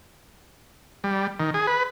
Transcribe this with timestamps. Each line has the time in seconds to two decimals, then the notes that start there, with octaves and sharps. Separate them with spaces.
1.04 G3
1.40 D#3
1.54 G#4
1.67 B4